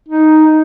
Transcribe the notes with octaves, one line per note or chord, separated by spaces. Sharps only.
D#4